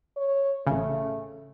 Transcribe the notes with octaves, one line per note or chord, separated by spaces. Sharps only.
C#5
A1 C#3 A3